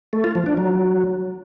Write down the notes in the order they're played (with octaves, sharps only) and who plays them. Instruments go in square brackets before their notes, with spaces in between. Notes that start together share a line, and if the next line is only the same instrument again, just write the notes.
[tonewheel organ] A3
F4
F3
D4
F#3